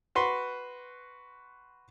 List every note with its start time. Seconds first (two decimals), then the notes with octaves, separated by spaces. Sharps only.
0.15 F#4 B4 C6